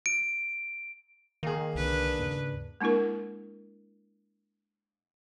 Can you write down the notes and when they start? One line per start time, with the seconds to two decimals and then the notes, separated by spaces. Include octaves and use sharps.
0.06 D7
1.43 D#3 A#3 G#4
1.75 C2 D3 D4 B4
2.19 D#2 G#2 C#3
2.81 G#3 A#3 D4 E4 A#4